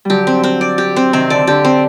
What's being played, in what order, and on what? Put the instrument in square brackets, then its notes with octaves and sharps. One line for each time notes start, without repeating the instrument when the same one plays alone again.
[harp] D3 F#3 G3 [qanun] G4
[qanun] C4
C4
D5
G4
C4
[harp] C3 D#3 [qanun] C4
[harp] D3 [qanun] D5
[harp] D3 [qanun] G4
[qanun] C4